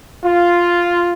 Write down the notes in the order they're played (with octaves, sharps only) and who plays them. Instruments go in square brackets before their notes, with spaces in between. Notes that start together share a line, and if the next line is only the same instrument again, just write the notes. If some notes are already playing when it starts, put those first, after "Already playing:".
[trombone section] F4